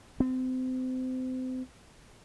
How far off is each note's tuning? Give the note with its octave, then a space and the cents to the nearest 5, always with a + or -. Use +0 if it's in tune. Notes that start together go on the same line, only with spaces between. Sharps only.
C4 -30